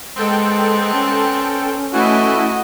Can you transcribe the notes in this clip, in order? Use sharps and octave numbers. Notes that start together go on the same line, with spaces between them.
A#2 G#3 B3 C4 A4 G5
C#4
E3 A3 E4 F#4 D#5